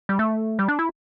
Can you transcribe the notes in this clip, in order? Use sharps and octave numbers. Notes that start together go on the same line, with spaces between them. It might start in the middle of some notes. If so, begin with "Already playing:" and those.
G3
A3
G3
D4
E4